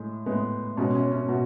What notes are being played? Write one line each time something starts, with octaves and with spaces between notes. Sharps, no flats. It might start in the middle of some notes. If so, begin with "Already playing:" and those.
Already playing: A2 G#3
A2 G#3 B3
B2 G#3 C#4
C#4
C#4
B2 F#4